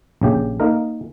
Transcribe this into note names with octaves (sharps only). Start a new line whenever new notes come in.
A#1 C#3 G4
A#3 D#4 A#4